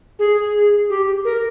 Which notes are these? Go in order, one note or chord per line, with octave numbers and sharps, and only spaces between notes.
G#4
G4
A#4